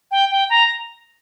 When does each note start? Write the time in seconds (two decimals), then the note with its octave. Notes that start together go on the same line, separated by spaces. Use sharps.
0.11 G5
0.31 G5
0.50 A#5